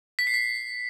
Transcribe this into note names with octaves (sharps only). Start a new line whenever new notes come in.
B6
C7
B6